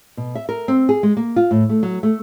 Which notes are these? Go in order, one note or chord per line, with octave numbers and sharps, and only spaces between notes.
B2
E5
A#4
C4
G#4
G#3
A#3
F4
A2
A3
F#3
A3